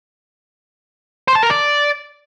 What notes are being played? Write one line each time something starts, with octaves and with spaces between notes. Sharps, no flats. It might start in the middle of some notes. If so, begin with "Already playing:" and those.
C5
A5
A#4
D5